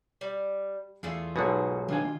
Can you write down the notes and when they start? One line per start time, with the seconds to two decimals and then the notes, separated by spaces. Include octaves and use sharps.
0.21 G3
1.03 E2 A3 F4 G#4
1.36 B1 G#2 B2 F#4
1.89 D#3 D4 F4 G#5